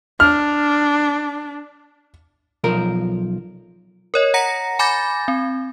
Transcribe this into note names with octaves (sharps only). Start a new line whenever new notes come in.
D4 F6
B1 F3 A#4
A#4 C#5 D#5
F#5 A#5 A#6 C#7
G#5 B5 D6 G6 A6 A#6
C4